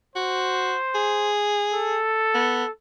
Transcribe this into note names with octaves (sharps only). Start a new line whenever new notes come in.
F#4 C5
G#4
A4
B3